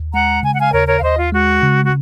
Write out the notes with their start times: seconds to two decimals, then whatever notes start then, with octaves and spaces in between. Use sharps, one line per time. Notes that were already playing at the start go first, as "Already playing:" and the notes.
Already playing: D#2
0.13 G#3 F#5 A#5
0.43 C#3 G#5
0.53 F#5
0.61 F5 G#5
0.72 D#2 A#4 C#5
0.88 A#4 C#5
0.97 F5
1.02 D#2 C5 D#5
1.18 F4
1.32 G#3 F#4
1.63 C#3
1.85 F#4